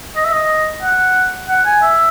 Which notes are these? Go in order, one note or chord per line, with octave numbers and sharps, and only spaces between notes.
D#5
E5
D#5
F#5
F#5
G#5
E5